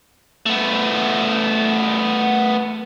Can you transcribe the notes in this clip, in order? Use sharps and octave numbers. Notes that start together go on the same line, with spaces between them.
A3 B3